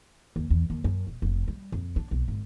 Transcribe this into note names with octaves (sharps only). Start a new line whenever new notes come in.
D#2
E2
D#2
F#2
D#1
F1
G3
F2
D4
B1
G#1